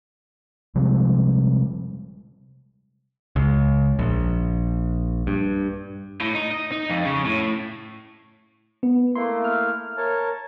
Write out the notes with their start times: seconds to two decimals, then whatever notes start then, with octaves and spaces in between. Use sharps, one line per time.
0.75 C3 F3 G3 G#3
3.36 C#2
3.99 A#1
5.27 G2
6.21 A2
6.35 D#4
6.51 D#5
6.72 D#4
6.90 F2
7.05 C#3
7.25 A2
8.83 B3
9.15 A3 A#3 E4 C6
9.44 F6
9.97 A#4 C#5 A5